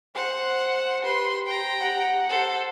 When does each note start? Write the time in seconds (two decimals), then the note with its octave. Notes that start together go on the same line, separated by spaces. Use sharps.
0.15 C5 F#5
1.02 G4 B4 C6
1.46 G5 A#5
1.81 F#5
2.29 A4 C5